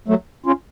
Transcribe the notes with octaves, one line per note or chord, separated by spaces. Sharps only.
F#3 A3
C#4 F4